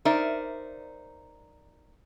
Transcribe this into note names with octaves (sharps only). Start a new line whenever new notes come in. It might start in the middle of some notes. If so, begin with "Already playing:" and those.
D#4 A#4 C5 D5 E5